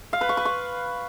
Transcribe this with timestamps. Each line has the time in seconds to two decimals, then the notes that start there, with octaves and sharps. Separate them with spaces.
0.13 F5
0.21 B4
0.29 C#6
0.37 B4
0.45 C#6